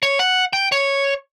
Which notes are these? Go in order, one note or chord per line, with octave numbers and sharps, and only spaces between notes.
C#5
F#5
G5
C#5